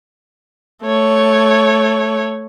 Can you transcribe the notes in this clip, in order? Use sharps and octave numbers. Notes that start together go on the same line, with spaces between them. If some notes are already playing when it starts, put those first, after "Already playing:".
A3 C#5